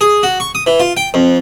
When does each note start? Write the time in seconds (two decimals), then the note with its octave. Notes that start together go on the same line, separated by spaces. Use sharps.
0.01 G#4
0.23 F#4
0.40 C#6
0.55 D#6
0.67 E3
0.80 F4
0.97 G5
1.14 F2